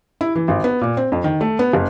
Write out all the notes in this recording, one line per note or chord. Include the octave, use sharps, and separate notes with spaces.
E4
E3
G#1
B3
A#2
C4
F2
D#3
A3
B3
F#1